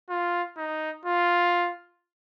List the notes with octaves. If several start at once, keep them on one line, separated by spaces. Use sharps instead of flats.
F4
D#4
F4